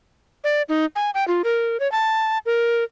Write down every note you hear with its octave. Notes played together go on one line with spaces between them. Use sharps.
D5
D#4
G#5
G5
F4
A#4
C#5
A5
A#4